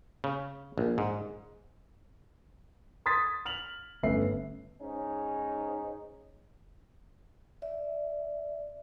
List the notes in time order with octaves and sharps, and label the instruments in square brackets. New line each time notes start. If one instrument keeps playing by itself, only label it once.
[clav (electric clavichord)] C#3
A#1
G#2
[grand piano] C6 D#6 G#6 A6 B6
F6 F7 F#7
G1 A3 B3 C#4 E5 C7
[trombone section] G#2 C#4 D#4
[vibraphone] D5 E5